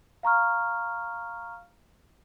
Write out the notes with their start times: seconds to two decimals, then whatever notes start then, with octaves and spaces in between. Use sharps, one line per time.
0.23 F5 A#5 C#6 F6